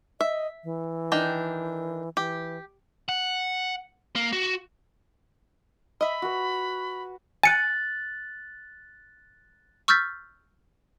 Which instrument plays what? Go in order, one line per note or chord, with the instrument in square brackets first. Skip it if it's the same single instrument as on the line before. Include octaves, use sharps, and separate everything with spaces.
[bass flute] D#5 [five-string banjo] E5
[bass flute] E3
[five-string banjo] D#3 D4 G5
[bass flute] E3 [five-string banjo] G4
[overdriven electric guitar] F#5
A#3
F#4
[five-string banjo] D#5 E5 [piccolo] B5
[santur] F#4 B4
[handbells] G#5 C#7 [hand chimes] F#6 A6
[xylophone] C#6 E6 F6 G6 A6 B6